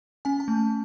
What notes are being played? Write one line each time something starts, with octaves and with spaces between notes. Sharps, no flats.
C#4 G#5
A5
A3